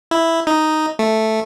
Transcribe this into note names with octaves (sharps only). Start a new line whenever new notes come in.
E4
D#4
A3